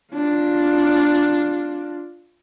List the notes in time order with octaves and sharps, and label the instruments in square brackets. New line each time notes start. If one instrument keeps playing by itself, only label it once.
[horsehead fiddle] D4 F4